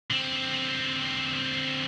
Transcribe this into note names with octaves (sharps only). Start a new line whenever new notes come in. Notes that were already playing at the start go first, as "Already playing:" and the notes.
D3 C4